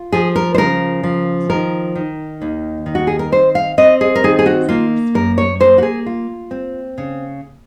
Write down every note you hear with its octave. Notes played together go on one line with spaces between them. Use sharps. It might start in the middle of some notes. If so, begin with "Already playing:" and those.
Already playing: F4
F3 G#4
A#4
C5
C#3 A#4
F3
D#3 A#4
D#3
D#2
D#3
F#4
G#4
A#4
C4 C5
F5
C4 D#5
G#4
A#4
D#3 G#4
G#4
F#4
A#3 F4
F#2 A#4
C#5
A#3 C5
F#4
G#4
F4
C4
C#3